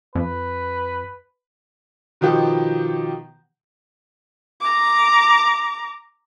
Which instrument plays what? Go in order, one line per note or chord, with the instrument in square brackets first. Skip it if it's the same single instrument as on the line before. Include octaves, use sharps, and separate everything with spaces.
[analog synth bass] F2 [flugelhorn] B4
[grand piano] B2 D#3 F3 G4
[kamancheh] A#5 D6